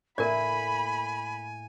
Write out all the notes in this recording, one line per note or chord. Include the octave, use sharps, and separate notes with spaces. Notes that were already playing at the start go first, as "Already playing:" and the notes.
A2 A#3 A#4 D5 G#5 B5